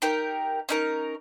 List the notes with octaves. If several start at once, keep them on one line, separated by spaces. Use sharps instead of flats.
D#4 G4 A#4
C#4 D#4 A#4